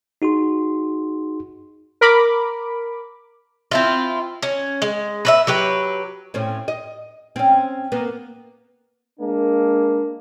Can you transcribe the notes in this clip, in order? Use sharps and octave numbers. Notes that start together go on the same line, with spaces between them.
D#4 F#4 G#4 C6
A#4 B5 D6
C4 E4 F4
C#4
G#3
B4 C#5 E5
F#3 G4 B4
A2 C4 C#4
D#5
C4 C#4
A#3 B3
G#3 A#3 D4